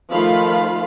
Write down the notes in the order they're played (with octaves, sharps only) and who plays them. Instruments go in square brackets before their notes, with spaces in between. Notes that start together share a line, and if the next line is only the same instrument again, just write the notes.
[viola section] D#3 F3 A3 F4 F5 B5